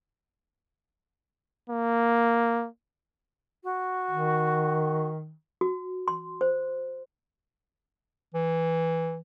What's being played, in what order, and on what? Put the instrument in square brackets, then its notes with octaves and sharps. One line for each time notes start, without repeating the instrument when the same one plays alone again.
[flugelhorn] A#3
[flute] F#4
[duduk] D#3
[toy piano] F#4
C6
C5
[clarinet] E3